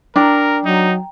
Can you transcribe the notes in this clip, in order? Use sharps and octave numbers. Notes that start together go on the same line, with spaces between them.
D4 A#4 G5 A#5
F#3 D#4